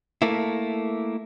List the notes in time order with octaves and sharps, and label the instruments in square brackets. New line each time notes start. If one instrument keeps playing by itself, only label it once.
[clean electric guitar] A3 A#3 E4